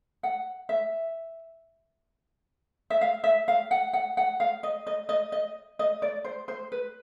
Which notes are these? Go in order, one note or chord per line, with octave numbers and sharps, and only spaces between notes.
F#5
E5
E5
F5
E5
F5
F#5
F#5
F#5
F5
D#5
D#5
D#5
D#5
D#5
D5
C5
C5
B4